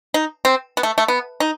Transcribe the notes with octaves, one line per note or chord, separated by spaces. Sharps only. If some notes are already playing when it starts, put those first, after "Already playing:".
D#4
C4
B3
A3
A3
B3
D#4